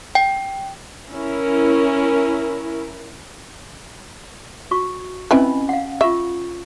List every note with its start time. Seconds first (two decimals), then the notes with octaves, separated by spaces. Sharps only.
0.15 G5
1.12 C#4 E4 A#4
4.71 F#4 C#6
5.31 C4 C#4 E4 B4 D#5 G#5
5.69 F5 F#5
6.01 F4 E5 C#6